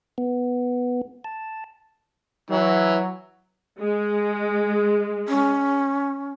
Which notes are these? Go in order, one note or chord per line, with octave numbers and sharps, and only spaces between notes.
B3
A5
E3 F#3
G#3
C#4